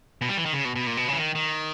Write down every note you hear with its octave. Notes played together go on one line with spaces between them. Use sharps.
B2
G3
E3
D#3
C#3
B2
B2
A#2
B2
C#3
E3
D#3
D#3